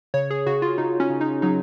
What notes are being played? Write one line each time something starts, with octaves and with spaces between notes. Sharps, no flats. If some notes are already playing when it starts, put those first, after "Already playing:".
C#3 C#5
G#4
C#3 F#4
F4
C#3 D#4
C#4
C#3
D#4
F#3 D#4